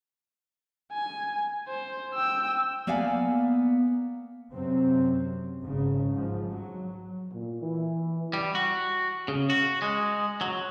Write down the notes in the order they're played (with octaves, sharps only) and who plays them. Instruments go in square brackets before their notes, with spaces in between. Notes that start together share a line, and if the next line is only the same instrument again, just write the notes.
[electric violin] G#5
C5
G5 E6
[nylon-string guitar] A#3 B3 D5 F5 G#5
[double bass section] F#2 C3 F#3 C4
G#1 C#3
G#2 F3
F#3
[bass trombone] A#2
E3
[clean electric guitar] G3
F#4
C#3
F#4
G#3
F#3